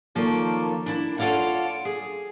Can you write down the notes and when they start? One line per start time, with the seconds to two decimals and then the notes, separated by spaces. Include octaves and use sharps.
0.15 D#3 F3 A#3 A4 C#5 D5
0.86 D4 E4
1.18 F4 A4 C#5 D5 F5 F#5
1.85 G#4